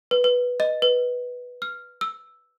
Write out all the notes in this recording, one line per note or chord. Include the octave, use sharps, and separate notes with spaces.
B4
B4
D#5
B4
F6
E6